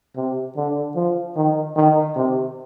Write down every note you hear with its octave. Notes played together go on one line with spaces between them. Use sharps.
C3
D3
F3
D#3
D#3
C3